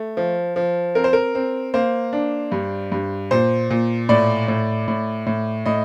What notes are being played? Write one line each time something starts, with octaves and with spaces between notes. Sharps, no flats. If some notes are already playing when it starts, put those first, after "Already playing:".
Already playing: A3
F3
F3
C4 A#4
C5
A#4
C4
A#3 C5
D4
G2
G2
A#2 C5
A#2
A2 D5
A2
A2
A2
A2 D#5